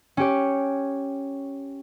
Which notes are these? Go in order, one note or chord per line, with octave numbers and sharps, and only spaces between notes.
C#4 G4 C#5